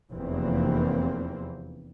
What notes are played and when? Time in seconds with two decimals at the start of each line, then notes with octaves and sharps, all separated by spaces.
0.11 F1 E2 E3 A#3 C4